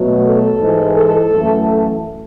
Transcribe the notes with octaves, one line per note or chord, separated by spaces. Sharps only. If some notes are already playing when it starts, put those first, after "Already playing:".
Already playing: B2 F#3 A3
A4
G#2 E3 G#3
A4
F#2 E3 A3